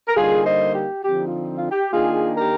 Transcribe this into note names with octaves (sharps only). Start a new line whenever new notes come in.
A#4
D3 G3 A#3 D#4 F4 G#4
C5 D#5
G4
D3 F3 C4 D#4 G4
F4
F4
G4
D#3 A#3 D4 F4 G#4
G4 A#4